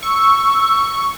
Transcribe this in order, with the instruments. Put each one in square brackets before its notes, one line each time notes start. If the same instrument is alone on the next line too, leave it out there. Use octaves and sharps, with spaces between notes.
[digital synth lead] C#6 [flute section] E6